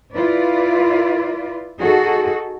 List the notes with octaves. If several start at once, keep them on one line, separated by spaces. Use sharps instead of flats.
E4 F4 B4 D5
D#4 F#4 G#4 A4